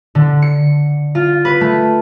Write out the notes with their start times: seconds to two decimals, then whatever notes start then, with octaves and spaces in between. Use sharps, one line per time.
0.15 D3
0.42 C#7
1.15 F4
1.45 B4
1.61 A3